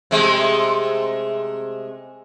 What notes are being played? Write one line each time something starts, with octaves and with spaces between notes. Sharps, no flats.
C3 G#3 A3